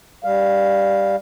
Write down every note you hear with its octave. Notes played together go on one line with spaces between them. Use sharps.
G3 F5